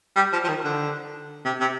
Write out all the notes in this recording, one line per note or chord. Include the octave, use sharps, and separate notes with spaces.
G3
F3
F3
D#3
D3
C3
C3